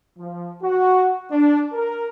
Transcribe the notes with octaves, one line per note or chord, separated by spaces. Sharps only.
F3
F#4
D4
A#4